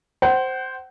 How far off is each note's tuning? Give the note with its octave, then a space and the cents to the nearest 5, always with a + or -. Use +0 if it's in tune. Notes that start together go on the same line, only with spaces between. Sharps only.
C5 +0 F#5 +40